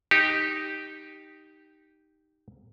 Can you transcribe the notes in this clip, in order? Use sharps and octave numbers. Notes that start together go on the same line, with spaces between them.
D#4 G4